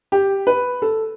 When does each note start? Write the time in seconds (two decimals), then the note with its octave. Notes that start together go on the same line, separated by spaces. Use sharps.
0.12 G4
0.47 B4
0.82 A4